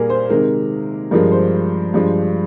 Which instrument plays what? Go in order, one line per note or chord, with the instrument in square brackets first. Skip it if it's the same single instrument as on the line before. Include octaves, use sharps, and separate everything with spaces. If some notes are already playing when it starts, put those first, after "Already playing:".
Already playing: [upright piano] A#2 G3 G#4 A#4
C5
C3 D#3 G#3 A#4
G2 F3 G#3 A#4
C5
G2 F3 G#3